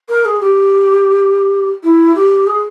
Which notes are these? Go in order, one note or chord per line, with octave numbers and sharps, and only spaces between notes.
A#4
G#4
G4
E4
G4
G#4